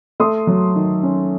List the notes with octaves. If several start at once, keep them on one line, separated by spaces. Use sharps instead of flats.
A3 C6 D#6
F#3
D#3
C#4